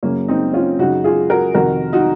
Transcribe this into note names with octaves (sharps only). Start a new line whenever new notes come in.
F#2 C#3 A#3 C#4
C4 D#4
C#4 F4
F#2 C#3 D#4 F#4
F4 G#4
F#4 A#4
F2 C3 D#3 F#4 A#4
D#4 F#4